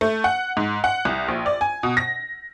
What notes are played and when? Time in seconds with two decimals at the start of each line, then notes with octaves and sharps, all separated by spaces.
0.01 A3
0.24 F#5
0.57 G#2
0.84 F#5
1.05 C2
1.28 A#1
1.46 D5
1.61 G#5
1.83 B2
1.97 A#6